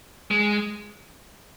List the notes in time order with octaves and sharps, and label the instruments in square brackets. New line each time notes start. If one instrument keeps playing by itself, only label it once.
[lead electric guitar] G#3